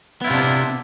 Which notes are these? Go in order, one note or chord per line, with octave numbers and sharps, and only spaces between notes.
C3 B3 D4 E4 F4